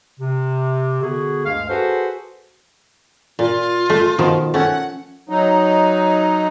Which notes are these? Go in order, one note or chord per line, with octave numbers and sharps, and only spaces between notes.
C3
D3 B3 F#4 G#4
D2 G2 G#3 F5
F#4 G#4 A4 B4 C5
A#2 F4
A3
B2 D#3 F3
A3 C#4 F#5
F#3 D#4